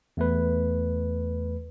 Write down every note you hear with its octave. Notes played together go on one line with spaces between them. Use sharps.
E2 A3 B4